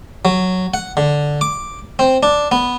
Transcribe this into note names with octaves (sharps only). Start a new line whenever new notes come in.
F#3
F#5
D3
D6
C4
D4
B3